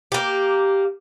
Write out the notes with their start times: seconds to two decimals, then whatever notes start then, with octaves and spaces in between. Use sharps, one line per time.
0.12 A#3 G4